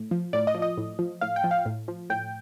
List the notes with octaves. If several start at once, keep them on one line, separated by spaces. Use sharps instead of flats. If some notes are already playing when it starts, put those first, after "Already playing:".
Already playing: A2
F3
A2 D5
D#5
F3
D#5
A2
F3
A2 F5
G5
F3
F5
A2
F3
A2 G5